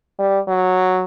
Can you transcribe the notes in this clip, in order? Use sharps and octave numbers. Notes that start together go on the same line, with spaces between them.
G3
F#3